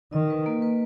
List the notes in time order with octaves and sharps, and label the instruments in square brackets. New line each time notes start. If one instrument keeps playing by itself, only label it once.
[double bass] D#3 [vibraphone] D#5
[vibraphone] B4
A#3
B4